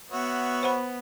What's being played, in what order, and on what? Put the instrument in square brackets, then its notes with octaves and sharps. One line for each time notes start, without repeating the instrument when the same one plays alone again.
[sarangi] B3 [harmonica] F#4 C#5 E5
[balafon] C5 F#5 B5